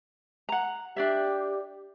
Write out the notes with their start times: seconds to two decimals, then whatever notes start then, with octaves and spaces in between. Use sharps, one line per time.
0.49 F#5 A#5
0.96 D4 G4 D5 E5